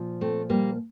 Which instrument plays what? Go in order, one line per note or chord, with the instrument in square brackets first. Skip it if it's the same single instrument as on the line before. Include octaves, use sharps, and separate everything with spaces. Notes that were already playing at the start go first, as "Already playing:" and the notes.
Already playing: [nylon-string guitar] A#2 F3
A3 C4
G3 A#3